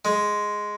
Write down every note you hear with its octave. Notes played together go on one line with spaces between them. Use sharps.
G#3